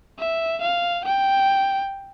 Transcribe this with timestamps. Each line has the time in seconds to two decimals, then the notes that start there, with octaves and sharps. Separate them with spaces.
0.19 E5
0.61 F5
1.04 G5